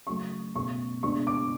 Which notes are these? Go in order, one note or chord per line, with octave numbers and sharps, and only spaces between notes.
C#3 F#3 A3 C#6
B2 A3 C#4 C#6
B2 G#3 D4 C#6
D6